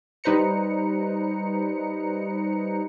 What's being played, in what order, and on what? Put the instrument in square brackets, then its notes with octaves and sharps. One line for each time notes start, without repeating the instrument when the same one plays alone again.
[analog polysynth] G3 D#4 B4 C5 A#5 C#7